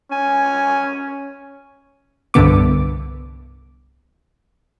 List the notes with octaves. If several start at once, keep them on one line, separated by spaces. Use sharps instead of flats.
C#4 G#5
C2 G2 D3 B3 D6